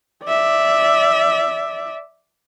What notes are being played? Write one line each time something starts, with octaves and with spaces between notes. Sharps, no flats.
D5 E5